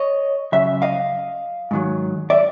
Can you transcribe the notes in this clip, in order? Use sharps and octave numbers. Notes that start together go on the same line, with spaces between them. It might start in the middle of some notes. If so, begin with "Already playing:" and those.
Already playing: C#5 D#5
F#2 C#3 F#3 E5
D#5 F5
G#2 D#3 F#3
D5 E5